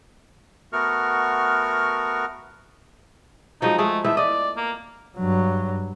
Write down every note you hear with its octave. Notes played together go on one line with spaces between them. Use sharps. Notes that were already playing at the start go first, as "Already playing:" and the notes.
A3 B3 F#4 A#4 C#6 F6
F3 F#3 G#3 D#4
G#3 A3 G#4
E3 A3 B3 E5
D5 D#5
A#3
G2 F#3